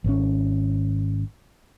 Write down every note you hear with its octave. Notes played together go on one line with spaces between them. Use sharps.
G#1 C3 C#4